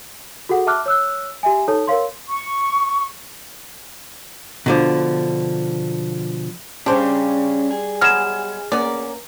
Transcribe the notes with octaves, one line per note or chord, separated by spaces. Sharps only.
F#4 G#4 A4 F#5
E5 A5 D6 F6 F#6
C#5 E6 F#6
G4 E5 G#5
D#4 A4 C#5 A5
A#4 C#5 F5 C6
C#6
B2 D3 F3
G3 C#4 D4 G4 G#4 C5
G#4
F#3 G#3 B3 F6 E7
A#3 B3 C#4 A#4 D5